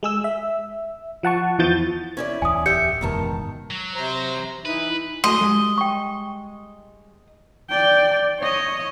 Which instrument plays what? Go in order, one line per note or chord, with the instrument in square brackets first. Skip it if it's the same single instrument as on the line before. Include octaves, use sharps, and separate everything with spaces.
[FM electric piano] G#3 G#4 E6
E5
F3 F#5 A5 C#6
E2 E3 F3 G6 A6
[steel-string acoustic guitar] C#4 E4 D5
[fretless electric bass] D1 E2 [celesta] G#5 D#6
[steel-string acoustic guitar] G4 E5 [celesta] G6 C#7
[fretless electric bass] F#1 E2 G#2 [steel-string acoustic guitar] B2 D#3 A5
[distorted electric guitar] F#3
[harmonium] C3 C5 A#5
[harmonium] E3 D#4 E4 [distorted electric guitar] B4
[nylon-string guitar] A3 F#4 G#5 [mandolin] D#5 [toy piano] C6
[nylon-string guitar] G3 G#3
[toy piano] G5 C#6
[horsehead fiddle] D5 G5
C#5 D#5